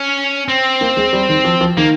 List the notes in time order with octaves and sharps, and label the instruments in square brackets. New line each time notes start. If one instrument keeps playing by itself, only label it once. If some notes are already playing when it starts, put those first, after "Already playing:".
Already playing: [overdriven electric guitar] C#4
C4
[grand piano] A#3
G#3
G3
D#3
F3
F3
[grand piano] D#3 [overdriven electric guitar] A#3